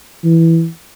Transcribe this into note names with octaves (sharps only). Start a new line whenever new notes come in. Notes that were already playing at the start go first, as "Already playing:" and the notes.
E3